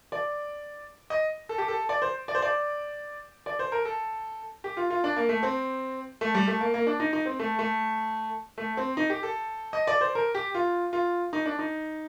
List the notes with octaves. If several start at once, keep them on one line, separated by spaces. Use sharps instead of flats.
D5
D#5
A4
G4
A4
D5
C5
D5
C5
D5
D5
C5
A#4
A4
G4
F4
F4
D4
A#3
A3
C4
A3
G3
A3
A#3
A#3
D4
D#4
D#4
C4
A3
A3
A3
C4
D#4
G4
A4
D#5
D5
C5
A#4
G4
F4
F4
D#4
D4
D#4